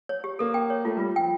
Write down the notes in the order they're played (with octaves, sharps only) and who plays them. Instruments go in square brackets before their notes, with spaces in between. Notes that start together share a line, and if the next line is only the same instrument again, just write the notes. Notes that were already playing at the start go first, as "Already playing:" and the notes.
[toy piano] C#5
G4
[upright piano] A#3 [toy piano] A4
[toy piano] G5
C#5
[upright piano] A3 [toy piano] F4
[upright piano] G3 [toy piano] F4
[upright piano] F3 [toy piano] G5